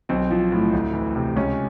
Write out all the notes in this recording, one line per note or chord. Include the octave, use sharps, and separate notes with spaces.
B1 C4
F3
A2
D2
E3
C3
C#2 C#4